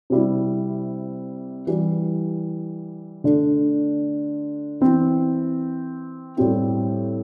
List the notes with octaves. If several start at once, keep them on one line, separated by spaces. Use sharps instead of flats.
C3 G3 E4
E3 G3 E4
D3 A3 D4
E3 C4 E4
A2 G3 C4 E4